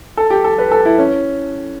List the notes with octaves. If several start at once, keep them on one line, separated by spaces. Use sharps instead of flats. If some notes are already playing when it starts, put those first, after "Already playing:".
A4
G4
A4
B4
A4
E4
C#4